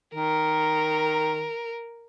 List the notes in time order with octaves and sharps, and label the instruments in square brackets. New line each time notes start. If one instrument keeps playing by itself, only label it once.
[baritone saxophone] D#3 [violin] A#4